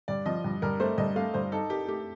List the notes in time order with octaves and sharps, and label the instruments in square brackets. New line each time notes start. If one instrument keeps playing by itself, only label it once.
[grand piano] G2 [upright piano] D5
[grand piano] F3 [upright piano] D#5
[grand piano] G2
[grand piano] G2 [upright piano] A#4
[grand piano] A3 [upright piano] C5
[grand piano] G2 [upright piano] D#5
[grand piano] A3 [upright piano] F5
[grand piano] G2 [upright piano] C5
[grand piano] D#4 [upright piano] A4
[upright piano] G4 [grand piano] A#4
[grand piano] A3 [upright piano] G4